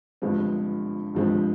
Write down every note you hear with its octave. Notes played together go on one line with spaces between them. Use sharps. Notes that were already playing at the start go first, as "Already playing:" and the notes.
G1 G2 F3 G#3 C4
G1 G2 F3 G#3 C4